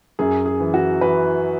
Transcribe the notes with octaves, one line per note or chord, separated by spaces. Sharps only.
F#2 G#4
G#4
E3
F#4
E3 B4